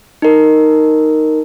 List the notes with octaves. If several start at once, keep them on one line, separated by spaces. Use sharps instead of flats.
D#4 A#4